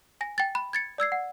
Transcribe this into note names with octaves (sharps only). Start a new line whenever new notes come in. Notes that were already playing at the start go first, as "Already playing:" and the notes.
G#5 A#6
G5 A6
B5
G#6 A6 C#7
D5 E6 G#6 C7
F#5